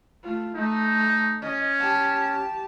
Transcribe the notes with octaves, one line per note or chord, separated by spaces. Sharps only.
A3 F4
A3 D#4
C#4 D#5
G4 A5